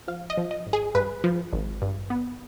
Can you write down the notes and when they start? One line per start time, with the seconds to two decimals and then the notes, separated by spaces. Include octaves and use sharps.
0.08 F3 F5
0.30 D#5
0.37 F3
0.51 D#5
0.66 G#1
0.73 G#4
0.95 G2 B4
1.24 F3
1.53 G#1
1.82 G2
2.10 B3